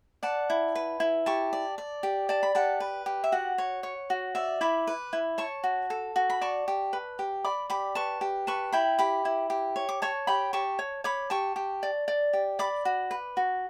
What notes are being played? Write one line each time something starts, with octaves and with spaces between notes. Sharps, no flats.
D5 F#5 A5
E4
B4
E4
G4 A5 C#6
D5
D5
G4
D5 A5
B5
G4 F#5 A5
B4
G4
E5
F#4 F#5
C#5
C#5
F#4
D5 E5
E4 B5 D6
B4
E4
C#5 A5 C#6
F#4
A4
F#4
B5
D5 A5 C#6
G4
B4
G4
D5 B5 D6
G4 B5 D6
B4 A5 C#6
G4
B4 A5 C#6
E4 G5 B5
G4 B5 D6
E4
G4
C#5
D6
C#5 A5 C#6
G4 G5 B5
G4 A5 C#6
C#5
C#5 B5 D6
G4 A5 C#6
G4
D5
D5
G4
D5 B5 D6
F#4
B4
F#4